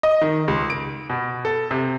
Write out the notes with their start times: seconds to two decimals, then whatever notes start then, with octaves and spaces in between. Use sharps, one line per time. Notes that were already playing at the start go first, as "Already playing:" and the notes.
0.03 D#5
0.21 D#3
0.48 C#2
0.70 D7
1.10 B2
1.45 A4
1.71 C3